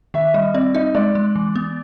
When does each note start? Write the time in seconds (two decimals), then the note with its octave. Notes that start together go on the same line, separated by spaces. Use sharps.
0.14 D#3 E5
0.34 G3 D#5
0.54 C4 D5
0.75 D#4 D#5
0.95 G#3 D5
1.15 G#3
1.36 E3
1.56 B3